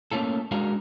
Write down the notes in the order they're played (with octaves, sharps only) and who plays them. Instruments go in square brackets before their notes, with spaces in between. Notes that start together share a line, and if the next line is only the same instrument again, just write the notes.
[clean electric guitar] A3 A#3 C#4 F4 A4
G#3 D4 F#4 A#4 F5